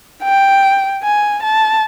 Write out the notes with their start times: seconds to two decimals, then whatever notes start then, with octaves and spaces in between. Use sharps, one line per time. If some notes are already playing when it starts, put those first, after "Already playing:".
0.23 G5
1.03 G#5
1.43 A5